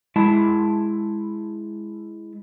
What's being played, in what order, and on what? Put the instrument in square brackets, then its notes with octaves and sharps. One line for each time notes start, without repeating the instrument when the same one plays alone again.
[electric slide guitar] G#3 E4 A5